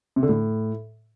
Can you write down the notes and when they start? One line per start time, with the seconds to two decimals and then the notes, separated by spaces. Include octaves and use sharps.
0.16 C3
0.23 D3
0.29 A2